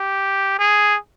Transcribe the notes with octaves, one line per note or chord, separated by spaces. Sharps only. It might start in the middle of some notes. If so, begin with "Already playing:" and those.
Already playing: G4
G#4